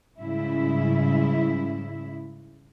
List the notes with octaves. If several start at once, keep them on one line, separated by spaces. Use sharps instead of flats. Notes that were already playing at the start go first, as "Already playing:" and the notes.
G#2 C#3 G3 E4 E5